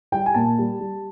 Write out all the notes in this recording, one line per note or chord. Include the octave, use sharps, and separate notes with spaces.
G3 G5
G#5
A#2 A5
G3
G3